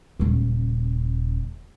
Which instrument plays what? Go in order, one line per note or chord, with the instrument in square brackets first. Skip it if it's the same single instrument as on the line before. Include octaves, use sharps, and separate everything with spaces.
[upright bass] D#1 C#3